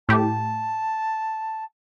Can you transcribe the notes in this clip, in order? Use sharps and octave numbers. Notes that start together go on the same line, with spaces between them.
A2 G4 A5